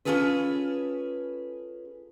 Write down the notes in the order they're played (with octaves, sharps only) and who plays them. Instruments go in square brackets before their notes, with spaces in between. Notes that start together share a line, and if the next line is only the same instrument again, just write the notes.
[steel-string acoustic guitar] C#4 D#4 F4 G#4 A4 B4